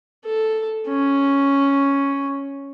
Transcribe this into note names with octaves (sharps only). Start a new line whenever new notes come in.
A4
C#4